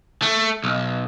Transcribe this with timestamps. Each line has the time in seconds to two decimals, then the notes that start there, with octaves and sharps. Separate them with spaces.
0.22 A3
0.64 B1